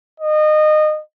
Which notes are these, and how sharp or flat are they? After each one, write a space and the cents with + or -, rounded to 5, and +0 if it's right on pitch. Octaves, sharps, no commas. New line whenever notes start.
D#5 -25